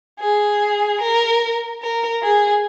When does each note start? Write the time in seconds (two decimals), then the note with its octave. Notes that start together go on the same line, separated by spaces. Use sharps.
0.19 G#4
1.00 A#4
1.82 A#4
2.22 G#4